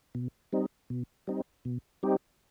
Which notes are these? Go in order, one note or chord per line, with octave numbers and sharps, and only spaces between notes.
B2
G3 C4 D#4
B2
G3 C4 D#4
B2
G3 C4 D#4 G4